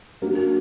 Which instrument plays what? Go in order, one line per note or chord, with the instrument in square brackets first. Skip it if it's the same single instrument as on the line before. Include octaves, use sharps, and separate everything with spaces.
[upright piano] F#3 A#3 D4 F#4